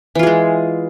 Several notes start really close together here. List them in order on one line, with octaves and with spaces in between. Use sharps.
E3 F4 G#4 G#3